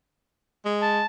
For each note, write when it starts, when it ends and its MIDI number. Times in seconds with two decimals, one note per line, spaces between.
0.65 1.02 56
0.82 1.06 81